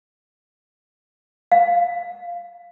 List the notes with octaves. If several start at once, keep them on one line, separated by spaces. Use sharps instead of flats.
F5